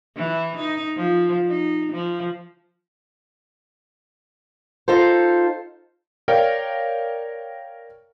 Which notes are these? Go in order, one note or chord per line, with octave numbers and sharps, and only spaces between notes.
E3
D#4
F3
D#4
F3
D#4 F4 A4 C5
A#4 C#5 D5 F5 G5